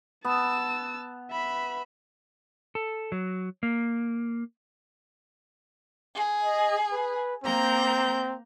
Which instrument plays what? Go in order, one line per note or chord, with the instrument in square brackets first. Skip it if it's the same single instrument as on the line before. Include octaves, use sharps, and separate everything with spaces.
[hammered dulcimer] B3 [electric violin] A5 E6
[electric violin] E5 B5
[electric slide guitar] A4
F#3
A#3
[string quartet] G#4
[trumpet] D#5
B4
[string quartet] A#3 A#5 G6 [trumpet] C4